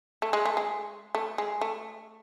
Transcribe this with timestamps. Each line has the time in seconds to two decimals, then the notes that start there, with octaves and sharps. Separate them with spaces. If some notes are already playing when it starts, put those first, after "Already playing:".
0.22 A3
0.33 G#3
0.46 A3
0.57 G#3
1.15 A3
1.38 G#3
1.61 A3